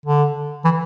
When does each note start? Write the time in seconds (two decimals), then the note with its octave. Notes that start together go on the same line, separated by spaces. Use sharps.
0.06 D3
0.64 E3